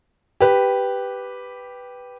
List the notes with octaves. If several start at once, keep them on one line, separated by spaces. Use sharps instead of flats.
G4 B4